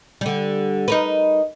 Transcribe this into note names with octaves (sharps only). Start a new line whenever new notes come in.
D3 G3
D#4 A#4 B4